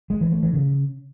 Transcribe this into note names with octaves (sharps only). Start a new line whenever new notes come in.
G#3
E3
A3
E3
C#3